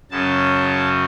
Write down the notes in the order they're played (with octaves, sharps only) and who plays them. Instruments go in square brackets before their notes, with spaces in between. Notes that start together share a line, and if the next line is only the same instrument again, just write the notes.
[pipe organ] F#2 C#3 F#3 A5